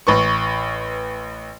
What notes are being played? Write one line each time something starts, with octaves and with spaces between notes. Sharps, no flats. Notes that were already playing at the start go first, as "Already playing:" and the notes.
A1 B4 C#6